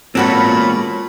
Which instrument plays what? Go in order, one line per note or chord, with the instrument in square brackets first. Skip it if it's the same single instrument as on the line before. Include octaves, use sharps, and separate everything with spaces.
[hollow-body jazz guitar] E2 G#3 C4 [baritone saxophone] A#2 [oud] C#4 F#4 A4 [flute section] B5